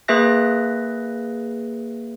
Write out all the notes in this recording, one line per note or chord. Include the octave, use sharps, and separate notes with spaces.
A#3 G#4 B4 E5 F#6 A#6